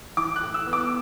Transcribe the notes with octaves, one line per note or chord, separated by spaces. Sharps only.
E3 D6
F#6
A2
E6
B3
D6